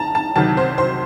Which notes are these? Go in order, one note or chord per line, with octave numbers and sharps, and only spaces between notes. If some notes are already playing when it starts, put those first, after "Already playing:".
Already playing: A5 A#5
A5
C2 C3 D#3 F#3 A5
C5
C5